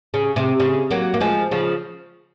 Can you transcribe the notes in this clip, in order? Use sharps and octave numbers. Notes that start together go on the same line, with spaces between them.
C#3
C3
C#3
F#3 A#3
A#3
F3 G#3
C#3 F3